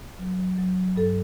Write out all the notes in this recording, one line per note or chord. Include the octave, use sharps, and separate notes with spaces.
F#3
F#3
F#3
F#3
G2 A4